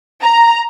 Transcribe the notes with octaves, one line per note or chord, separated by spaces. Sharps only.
A#5